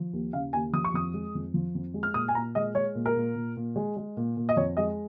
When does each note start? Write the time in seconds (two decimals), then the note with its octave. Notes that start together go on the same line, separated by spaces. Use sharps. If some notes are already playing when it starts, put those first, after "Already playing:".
Already playing: F3
0.13 D#2
0.33 C#3 F5
0.53 D#2 G#5
0.73 F3 D#6
0.84 C#6
0.94 F2 D#6
1.14 G#3
1.35 F2
1.54 F3
1.75 F2
1.94 G#3
2.03 F6
2.14 A#2 D#6
2.28 G#5
2.35 A#2 A#5
2.55 G#3 D#5
2.75 G#3 C#5
2.95 A#2
3.06 A#4
3.16 A#2
3.35 A#2
3.57 A#2
3.76 G#3
3.97 G#3
4.17 A#2
4.37 A#2
4.49 D#5
4.56 F2 C#5
4.77 G#3 D#5